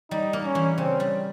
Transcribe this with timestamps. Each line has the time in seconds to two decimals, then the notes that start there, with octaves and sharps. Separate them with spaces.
0.11 G3 D#4
0.33 A#3
0.44 C#4
0.55 E3
0.77 C#3 C4
1.00 G3